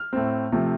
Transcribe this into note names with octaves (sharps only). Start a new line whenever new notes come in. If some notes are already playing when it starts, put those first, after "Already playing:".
Already playing: F6
A2 A3 C4
C3 F3 A3